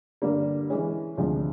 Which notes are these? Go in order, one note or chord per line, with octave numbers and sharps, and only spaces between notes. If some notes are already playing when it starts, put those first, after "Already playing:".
G2 D3 G3 A#3
E3 G#3 C#4
D2 C3 F3 G#3